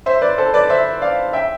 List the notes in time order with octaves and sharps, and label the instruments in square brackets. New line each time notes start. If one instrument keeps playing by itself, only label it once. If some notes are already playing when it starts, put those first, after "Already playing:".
[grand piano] C5 E5
B4 D5
A4 C5
B4 D5
C5 E5
D5 F5
E5 G5